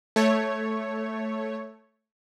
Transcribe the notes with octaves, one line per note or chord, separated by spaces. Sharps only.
A3 C#5